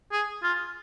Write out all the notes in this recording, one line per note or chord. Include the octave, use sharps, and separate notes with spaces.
G#4
F4